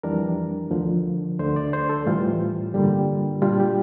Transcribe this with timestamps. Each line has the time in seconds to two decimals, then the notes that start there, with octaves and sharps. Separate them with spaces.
0.03 F2 E3 G3 D4 A#4
0.71 D2 D3 F3
1.39 D2 D3 A3 C5
1.56 D5
1.73 C5
1.89 A4
2.06 A2 E3 G3 F4
2.74 G2 D3 G3 A#3
3.42 A#2 G3 D4 F4
3.60 G4